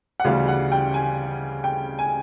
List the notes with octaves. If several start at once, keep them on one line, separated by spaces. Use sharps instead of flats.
F#5
D2 C#3 E3 G3 F5
F#5
G5
G#5
G5
G#5